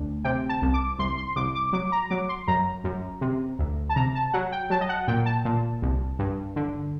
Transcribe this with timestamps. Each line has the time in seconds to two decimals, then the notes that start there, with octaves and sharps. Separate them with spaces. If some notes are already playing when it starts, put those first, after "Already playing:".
Already playing: D2
0.24 C3 G5
0.49 A5
0.62 C2
0.74 D6
0.99 C2 C6
1.18 C6
1.36 C2 D6
1.55 D6
1.73 F#3 D6
1.92 A#5
2.10 F#3 D6
2.29 C6
2.47 F#2 A#5
2.84 F#2
3.21 C3
3.59 D2
3.89 A5
3.96 C3 A#5
4.15 A5
4.33 F#3 F#5
4.52 G5
4.70 F#3 A5
4.81 D#5
4.89 F#5
5.08 A#2 G5
5.26 A5
5.45 A#2
5.82 C2
6.19 G2
6.56 D3